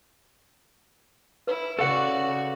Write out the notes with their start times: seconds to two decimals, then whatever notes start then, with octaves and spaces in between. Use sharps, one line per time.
1.47 E4 B4
1.79 C#3 F#4 A4 D5 F5 F#5